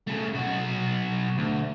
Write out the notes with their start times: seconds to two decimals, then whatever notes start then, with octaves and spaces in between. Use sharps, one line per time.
0.08 C#3 A3
0.34 B1 F#4
1.38 D2